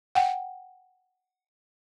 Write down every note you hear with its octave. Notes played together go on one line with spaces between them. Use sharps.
F#5 G5